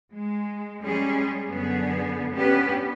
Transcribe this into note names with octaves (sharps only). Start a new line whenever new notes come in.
G#3
G3 G#3 C#4 G#4
F#2 D3 B3 G#4
B3 C#4 D4 G4 B4